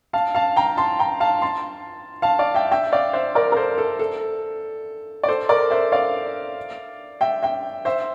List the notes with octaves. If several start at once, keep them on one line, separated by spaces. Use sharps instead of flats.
F5 A5
F5 A5
G5 A#5
A5 C6
G5 A#5
F5 A5
A5 C6
F5 A5
D5 F5
E5 G5
E5 G5
D5 F5
C5 E5
A#4 D5
A#4
A4 C5
A4
A4
D5
A4 C5
A#4 D5
C5 E5
D5 F5
E5 G5
E5 G5
C5 E5